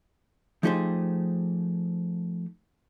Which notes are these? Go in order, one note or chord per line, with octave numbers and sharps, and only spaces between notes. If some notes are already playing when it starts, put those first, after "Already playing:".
F3 A3 D#4 G4 G#4 C5